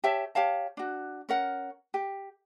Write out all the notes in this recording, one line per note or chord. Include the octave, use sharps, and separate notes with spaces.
G4 C#5 E5 A5
G4 C#5 F5 A5
D4 F#4
C#4 A#4 F#5
G4